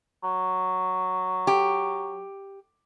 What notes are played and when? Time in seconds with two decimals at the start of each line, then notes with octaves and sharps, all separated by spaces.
0.24 F#3
1.47 G4